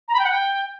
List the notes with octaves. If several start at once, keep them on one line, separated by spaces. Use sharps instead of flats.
A#5
B5
G5
F#5
G5